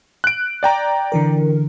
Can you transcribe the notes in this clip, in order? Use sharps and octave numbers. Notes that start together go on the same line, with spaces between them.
F#6 D7
D5 G5 A#5
D3 E3 A#4